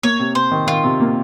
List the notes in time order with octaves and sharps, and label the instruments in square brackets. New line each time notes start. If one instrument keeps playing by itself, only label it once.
[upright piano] A#3 [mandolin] C#5
[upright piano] C3
[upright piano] C3 [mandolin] C5
[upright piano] D#3
[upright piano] D#3 [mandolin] F4
[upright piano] C3
A#3